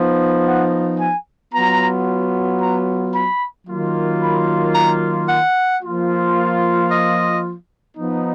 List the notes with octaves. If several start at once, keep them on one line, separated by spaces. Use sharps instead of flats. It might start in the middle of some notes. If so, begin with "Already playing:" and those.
Already playing: F3 B3 D#4
F#5
G#5
F#3 B3 F4 A#5
A#5
B5
D#3 F#3 A#3 F4
B5
A#5
F#5
F3 A#3 F4
D#5
F3 B3 D#4